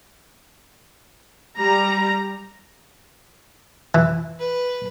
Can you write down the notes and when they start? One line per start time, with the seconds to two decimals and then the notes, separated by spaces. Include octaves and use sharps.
1.56 G3 A#5
3.95 E3
4.39 B4